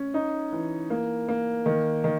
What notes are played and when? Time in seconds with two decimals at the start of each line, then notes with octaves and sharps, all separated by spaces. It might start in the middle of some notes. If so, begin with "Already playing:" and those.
Already playing: C#4
0.14 D#4
0.52 E3
0.90 A#3
1.29 A#3
1.66 D#3
2.04 D#3